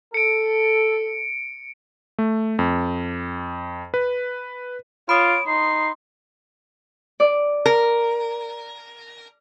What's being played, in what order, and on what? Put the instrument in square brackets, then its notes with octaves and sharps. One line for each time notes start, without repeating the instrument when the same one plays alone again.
[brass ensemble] A4 [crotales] C#7 D7
[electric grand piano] A3
F2
B4
[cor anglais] F4 [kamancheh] C#5 [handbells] B5 D#6 [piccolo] D7
[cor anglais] D#4 [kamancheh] C6 [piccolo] C7
[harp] D5
[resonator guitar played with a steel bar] A#4